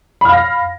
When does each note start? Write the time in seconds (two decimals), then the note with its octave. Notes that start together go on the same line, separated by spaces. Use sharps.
0.21 B5
0.25 F6
0.29 F5
0.33 A#6